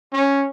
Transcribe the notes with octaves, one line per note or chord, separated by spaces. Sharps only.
C#4